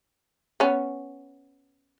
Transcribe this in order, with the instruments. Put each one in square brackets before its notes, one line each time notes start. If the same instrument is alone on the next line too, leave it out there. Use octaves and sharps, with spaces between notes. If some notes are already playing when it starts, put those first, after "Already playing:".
[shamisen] B3 C#4